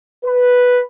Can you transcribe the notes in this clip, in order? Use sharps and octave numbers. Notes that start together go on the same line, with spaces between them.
B4